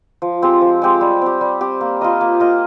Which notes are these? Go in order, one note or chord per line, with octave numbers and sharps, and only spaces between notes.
F3
G#3 C4 G4
F3
G#3 C4 G4
G3
C4 G4
G3
C4 G4
A#3
F4 A#4 D#5
A#3
F4 A#4 D#5